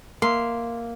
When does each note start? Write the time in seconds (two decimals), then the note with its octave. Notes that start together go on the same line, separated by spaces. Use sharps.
0.22 A#3 E5 C6